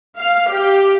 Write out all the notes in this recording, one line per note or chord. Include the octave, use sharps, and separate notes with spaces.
F5
G4